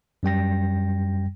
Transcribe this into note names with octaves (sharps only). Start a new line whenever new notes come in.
F#2 G3 G5 A#6